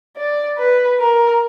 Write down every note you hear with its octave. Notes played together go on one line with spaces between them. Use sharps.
D5
B4
A#4